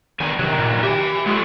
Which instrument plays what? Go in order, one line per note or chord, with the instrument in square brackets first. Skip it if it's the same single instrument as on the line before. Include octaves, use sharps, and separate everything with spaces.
[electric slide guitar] G2 B2 G#5 [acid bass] D#3
[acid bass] C3 [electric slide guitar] D#3 F#3
[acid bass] A#2
[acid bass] G4 [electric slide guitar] E5 G#5
[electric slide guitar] F#3 F4 A4 [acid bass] G#3